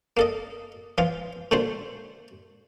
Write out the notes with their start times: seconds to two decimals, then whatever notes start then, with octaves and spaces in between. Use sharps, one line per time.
0.17 A#3 A4 D#5
0.98 E3 F3 F4
1.51 A#2 D3 A3 F#4 C5